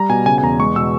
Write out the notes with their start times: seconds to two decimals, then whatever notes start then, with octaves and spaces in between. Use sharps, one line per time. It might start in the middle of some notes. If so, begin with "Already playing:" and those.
Already playing: G3 A#5
0.10 B2 G#5
0.26 C#3 G#5
0.38 G#5
0.43 E2 A#5
0.59 G#3 C#6
0.76 B2 E6